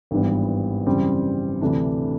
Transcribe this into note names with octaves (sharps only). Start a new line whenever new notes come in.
G#1 G2 E3 G3 B3
F#2 C#3 E3 G3 C4
D2 C3 E3 A3 D4